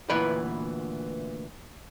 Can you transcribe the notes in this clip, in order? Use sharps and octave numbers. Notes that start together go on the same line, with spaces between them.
D2 A#2 E3 B3 B4